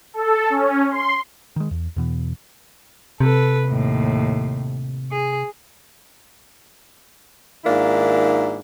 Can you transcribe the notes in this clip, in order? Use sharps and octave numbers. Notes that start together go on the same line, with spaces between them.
A4
C#4
C6
D#3 G#3
E2
E2 B2 E3
C3 A4 B4
D#2 A2
G#4
G#2 D#3 A#3 D4 E4 F4